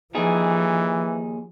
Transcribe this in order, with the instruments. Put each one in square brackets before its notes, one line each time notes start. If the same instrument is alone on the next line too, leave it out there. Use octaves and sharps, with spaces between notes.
[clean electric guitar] D#2 D#4 G#4 [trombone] E3 [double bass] F3